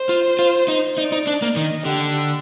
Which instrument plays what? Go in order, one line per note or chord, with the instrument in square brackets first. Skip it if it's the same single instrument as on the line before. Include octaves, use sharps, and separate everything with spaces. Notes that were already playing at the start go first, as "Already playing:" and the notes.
Already playing: [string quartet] C5
[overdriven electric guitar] F4
F4
D#4
[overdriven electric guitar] D#4 [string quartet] D5
[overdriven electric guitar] D#4
D4
A#3
[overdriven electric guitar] D#3 [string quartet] D#5
[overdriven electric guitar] D3 [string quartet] G4